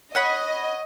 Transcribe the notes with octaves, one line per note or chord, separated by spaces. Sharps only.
C#5 D#5 F#5 B5